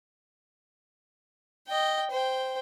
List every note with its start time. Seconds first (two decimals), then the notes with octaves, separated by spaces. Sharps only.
1.68 D#5 G5
2.11 C5 G5